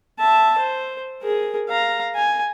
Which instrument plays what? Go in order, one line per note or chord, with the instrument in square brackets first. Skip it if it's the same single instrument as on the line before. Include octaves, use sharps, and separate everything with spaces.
[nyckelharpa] E5 A5
C5
G#4 A#4
F5 A#5
G#5